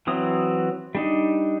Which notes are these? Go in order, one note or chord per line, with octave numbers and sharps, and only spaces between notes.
E3 F#3 C4 D#6
G3 D4 D#4